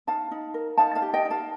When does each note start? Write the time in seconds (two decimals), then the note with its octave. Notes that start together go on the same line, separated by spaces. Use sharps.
0.07 D#4 F5 A5
0.31 D#4
0.54 A#4
0.77 D#4 F5 A5
0.95 F5 A5
1.02 G4
1.14 D#5 G5
1.25 D#4
1.30 F5 A5